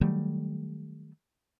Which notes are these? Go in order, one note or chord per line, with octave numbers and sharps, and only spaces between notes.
D#3 F#3 G3 A3